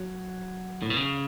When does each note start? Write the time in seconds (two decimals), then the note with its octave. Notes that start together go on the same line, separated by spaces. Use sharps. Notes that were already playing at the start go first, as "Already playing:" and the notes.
Already playing: F#3
0.82 A2
0.90 B2
0.97 C#3